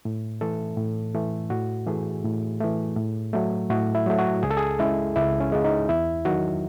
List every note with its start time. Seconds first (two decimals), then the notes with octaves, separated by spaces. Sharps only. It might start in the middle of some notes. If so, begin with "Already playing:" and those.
0.05 A2
0.41 E3 A3 A4
0.77 A2
1.14 E3 A3
1.50 A2 F#4
1.87 E3 A3 G#4
2.24 A2
2.60 E3 A3
2.96 A2
3.33 F#3 A3
3.70 A2 F#4
3.95 E4
4.06 F#3 A3
4.19 F#4
4.43 C#2 G#4
4.51 A4
4.57 G#4
4.79 C#3 G#3 E4
5.16 C#2 E4
5.40 C#4
5.52 C#3 G#3
5.65 D#4
5.89 E2 E4
6.25 D#3 F#3 F#4